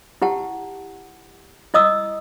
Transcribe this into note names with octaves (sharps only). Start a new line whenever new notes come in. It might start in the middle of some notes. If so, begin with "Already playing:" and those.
E4 G4 F#5 A5
E4 D#5 D#6 E6